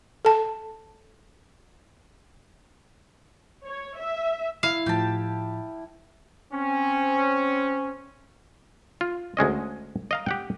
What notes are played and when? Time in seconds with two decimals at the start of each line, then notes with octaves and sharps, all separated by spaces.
0.25 A4 A5
3.67 C#5
4.00 E5
4.63 E4 F5
4.86 A2 F3 G4 A5
6.53 C4 C#4
9.01 F4
9.37 D2 G#3 C#4 D#5
10.11 D#5 F5 A#5
10.26 G4 F#5 G5